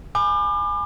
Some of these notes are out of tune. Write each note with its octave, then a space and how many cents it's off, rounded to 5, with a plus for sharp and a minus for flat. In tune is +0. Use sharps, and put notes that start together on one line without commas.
G#5 +0 B5 +10 D6 +35